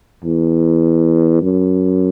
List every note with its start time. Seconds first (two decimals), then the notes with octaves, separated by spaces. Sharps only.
0.24 E2
1.42 F#2